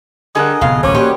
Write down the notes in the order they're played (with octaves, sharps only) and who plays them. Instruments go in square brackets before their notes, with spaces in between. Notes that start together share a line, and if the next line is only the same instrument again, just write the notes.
[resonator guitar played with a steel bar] D3 G3 [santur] G#4 A#4 F#5 [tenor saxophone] D#5
[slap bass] D1 C3 B3 [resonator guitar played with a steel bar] F2 F5
[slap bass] D1 A1 A#2 [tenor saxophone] C#4 [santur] C5 D6
[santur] G3 F#4 C6 [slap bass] A#3 [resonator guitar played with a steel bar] G4 D#5